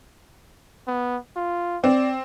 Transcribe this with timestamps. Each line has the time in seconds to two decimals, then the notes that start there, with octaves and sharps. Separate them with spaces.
0.87 B3
1.36 F4
1.84 C4 D5